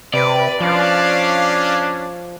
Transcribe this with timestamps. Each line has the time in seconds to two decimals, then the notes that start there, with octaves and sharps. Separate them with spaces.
0.14 C3 B4 D5
0.60 F3 C#4 D4 F5